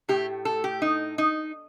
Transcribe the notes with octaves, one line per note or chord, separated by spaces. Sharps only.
A2 A3 G4
A4
G4
D#4
D#4